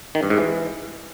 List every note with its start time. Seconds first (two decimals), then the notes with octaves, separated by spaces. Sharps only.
0.15 D#3
0.23 G2
0.30 G#2
0.38 E3